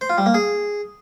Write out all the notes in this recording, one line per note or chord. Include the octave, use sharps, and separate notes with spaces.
C5
F4
G3
A#3
G#4